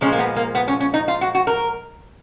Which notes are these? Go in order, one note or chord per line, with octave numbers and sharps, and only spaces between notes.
A#2 F3 G#3 C#4
A#3
B3
A#3
B3
C#4
C#4
D#4
F4
F#4
F#4
A#4